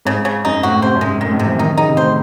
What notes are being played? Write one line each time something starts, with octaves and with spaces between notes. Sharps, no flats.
G#2 C#3
C#3
F#2 D#4
A2 F#4
C3 C5
F#2
G#2 G#3
A2 D#3
G#2
C3
E3
D#3 D#4
D#3
C#3 D#4
C3
A2 C5